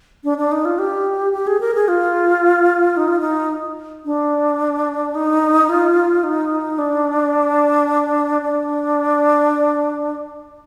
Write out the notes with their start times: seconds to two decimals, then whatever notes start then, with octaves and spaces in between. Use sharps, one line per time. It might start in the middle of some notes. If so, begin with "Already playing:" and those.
0.24 D4
0.38 D4
0.52 D#4
0.65 F4
0.79 G4
1.33 G4
1.47 G#4
1.61 A#4
1.75 G#4
1.88 F4
2.97 D#4
3.08 F4
3.20 D#4
4.05 D4
5.15 D#4
5.69 F4
6.23 D#4
6.78 D4
8.42 D4